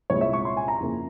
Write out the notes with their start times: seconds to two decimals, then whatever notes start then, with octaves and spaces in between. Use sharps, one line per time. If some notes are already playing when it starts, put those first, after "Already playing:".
0.10 C2 A#2 G#3 E4 C#5
0.21 E5
0.33 C#6
0.45 C6
0.57 G#5
0.68 A#5
0.80 F2 C#3 F3 A#3 E4